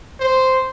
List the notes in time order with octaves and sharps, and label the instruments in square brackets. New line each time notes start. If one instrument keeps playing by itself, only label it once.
[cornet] C5